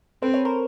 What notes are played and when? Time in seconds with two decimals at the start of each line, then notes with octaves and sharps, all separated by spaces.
0.22 C4 A4 B4
0.34 B4 C#5
0.45 A#4 C5